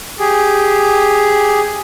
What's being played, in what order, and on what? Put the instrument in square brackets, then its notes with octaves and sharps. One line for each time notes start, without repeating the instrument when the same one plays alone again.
[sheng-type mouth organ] G4 G#4